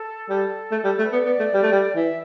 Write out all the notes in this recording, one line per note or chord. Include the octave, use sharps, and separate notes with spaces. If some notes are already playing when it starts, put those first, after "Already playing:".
Already playing: A4
G3 A4
A3
G3
A3
B4
B3 D5
B3
A3
G3
A3
G3
E3 E5